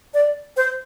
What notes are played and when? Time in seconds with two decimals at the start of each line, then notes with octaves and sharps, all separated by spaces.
0.14 D5
0.57 C5